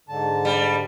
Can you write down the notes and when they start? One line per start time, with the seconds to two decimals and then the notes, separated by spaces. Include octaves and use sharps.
0.09 G#2 D3 A5
0.45 G3